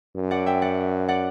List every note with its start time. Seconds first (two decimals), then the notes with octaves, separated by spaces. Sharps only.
0.16 F#2
0.31 D5 F#5
0.46 E5 G5
0.62 D5 F#5
1.08 D5 F#5